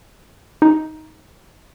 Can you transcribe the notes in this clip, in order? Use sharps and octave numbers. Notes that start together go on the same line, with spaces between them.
D#4